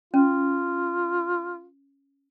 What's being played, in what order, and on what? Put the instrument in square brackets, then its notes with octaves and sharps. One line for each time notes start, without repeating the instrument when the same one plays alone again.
[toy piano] C#4 [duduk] F4